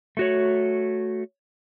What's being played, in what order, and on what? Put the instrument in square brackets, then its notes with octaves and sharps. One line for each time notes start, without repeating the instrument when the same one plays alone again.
[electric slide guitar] A3 F#4 C#5